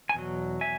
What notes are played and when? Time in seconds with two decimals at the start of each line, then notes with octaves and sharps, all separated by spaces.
0.09 G#5
0.14 E2 B2 F#3
0.61 E5 G#5